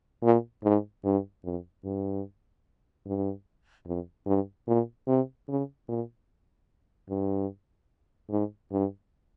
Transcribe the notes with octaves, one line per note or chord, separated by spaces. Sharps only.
A#2
G#2
G2
F2
G2
G2
F2
G2
A#2
C3
C#3
A#2
G2
G#2
G2